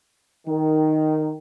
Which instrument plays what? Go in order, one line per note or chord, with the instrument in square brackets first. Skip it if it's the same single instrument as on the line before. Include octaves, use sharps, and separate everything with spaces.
[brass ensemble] D#3